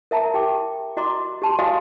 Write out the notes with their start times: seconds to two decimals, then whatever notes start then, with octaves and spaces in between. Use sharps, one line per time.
0.11 A#4 E5 A5 A#5
0.34 G4 G5 D6
0.97 F#4 D#5 A#5 C6 D6
1.42 G4 A5 C6
1.59 F#4 G4 D#5 F5 G#5 D#6